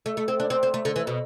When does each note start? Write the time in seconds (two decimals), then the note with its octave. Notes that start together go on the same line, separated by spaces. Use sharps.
0.06 A3
0.17 A3
0.28 C4
0.40 D4
0.50 C4
0.63 C4
0.74 A3
0.85 D3
0.96 E3
1.07 B2